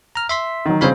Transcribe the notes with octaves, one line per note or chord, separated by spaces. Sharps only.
A#5 F6
E5 C6 B6
D#3 F#3
G1 C#3 C4 C#5 F5 B5